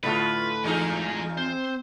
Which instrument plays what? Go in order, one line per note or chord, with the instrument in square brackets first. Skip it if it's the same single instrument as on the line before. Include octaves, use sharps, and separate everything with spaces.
[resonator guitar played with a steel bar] A2 D3 A3 [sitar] B3 F4 [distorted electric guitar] B4
[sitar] E2 D#4 G#4 [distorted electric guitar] G#3 A#5
[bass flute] C4 [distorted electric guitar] C5